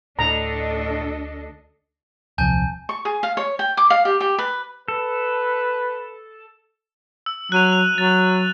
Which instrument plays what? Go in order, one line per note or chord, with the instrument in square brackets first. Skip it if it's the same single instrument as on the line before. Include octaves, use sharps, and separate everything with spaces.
[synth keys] D2 [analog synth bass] A2 [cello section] D4 A4 D#5 [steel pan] A#5
[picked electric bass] D#1 C2 F3 [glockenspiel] G#5 A5 G6
[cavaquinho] C#6
G#4
F5
C#5
G5
D6
F5
G4
G4
B4
[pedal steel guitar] A4 [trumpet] B4
[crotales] E6
[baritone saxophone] F#3 [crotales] F#6 D#7 F7
[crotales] F7
[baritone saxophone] F#3 [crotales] A6